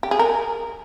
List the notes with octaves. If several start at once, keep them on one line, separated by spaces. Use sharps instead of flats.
G4
G#4
A#4